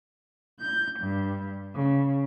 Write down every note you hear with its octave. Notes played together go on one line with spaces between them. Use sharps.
G6
G2
C#3